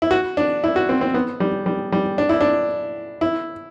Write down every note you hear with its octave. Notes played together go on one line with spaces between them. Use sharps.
E4
F#4
D4
E4
F#4
C4
C4
B3
G3
G3
G3
D4
E4
D4
E4